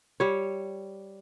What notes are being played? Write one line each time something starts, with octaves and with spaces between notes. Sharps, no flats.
G3 C#5